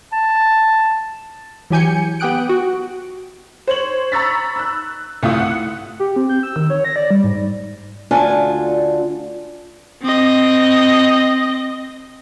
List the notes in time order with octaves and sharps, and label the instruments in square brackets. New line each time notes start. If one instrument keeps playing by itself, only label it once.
[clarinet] A5
[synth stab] E3 F#3 G4 G#5 G6 C#7
B3 G4 G5 D#6 F#6 D7
F#4
[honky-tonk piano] C5 C#5 F#7
A#5 B5 C#6 E6 A6 B6
E6 F#6
C2 A3 E4 F4 D#6
F#5
[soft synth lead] G4
C4
G6
E6
D#3
C#5
A#6
D5
G3
G#2
[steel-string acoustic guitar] D2 D4 F4 A4 G#5
[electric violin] C4 D#5